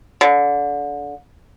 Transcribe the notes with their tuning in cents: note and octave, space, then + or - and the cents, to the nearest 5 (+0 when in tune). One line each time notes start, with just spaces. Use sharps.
D3 -25